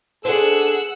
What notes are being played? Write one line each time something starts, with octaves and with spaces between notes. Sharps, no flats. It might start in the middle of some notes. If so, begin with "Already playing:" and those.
D4 G#4 A4 C5 F#5 E6